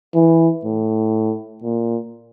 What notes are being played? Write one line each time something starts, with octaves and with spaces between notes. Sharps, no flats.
E3
A2
A#2